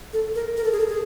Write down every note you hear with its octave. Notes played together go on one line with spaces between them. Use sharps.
A4
A#4
A#4
A4
G#4
A4
G#4